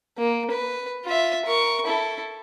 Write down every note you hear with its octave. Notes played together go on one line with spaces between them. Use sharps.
A#3
B4
F4 E5
A#4 C#6
E4 A4